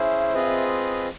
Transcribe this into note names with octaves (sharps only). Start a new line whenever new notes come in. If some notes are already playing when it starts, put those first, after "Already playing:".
Already playing: C#4 E4 G#4 C5 E5
C4 F4 G#4 B4 D#5